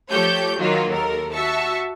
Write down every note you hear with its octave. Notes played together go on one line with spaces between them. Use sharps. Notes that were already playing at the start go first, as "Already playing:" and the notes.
F3 A3 G4 A4 C#5 G6
D#3 F#3 A#3 F4 F#4
D#2 A4 A#4
F#4 E5 A5 C#6